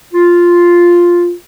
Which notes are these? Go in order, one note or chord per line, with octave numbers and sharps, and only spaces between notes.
F4